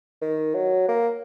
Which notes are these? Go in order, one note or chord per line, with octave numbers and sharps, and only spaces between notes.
D#3
F#3
A#3